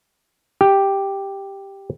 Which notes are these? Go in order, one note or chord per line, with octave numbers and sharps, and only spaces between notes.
G4